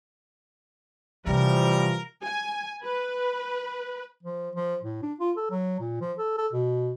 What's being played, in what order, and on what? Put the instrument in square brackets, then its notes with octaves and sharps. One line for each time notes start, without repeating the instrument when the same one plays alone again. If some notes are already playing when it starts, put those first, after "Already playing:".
[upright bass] C3 [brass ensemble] E3 F3 [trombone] G3 [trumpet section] A#4
[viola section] G#5
B4
[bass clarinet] F3
F3
A2
D4
F4
A4
F#3
A#2
F3
A4
A4
B2